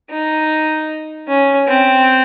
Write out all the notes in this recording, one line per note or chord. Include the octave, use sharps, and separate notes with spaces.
D#4
C#4
C4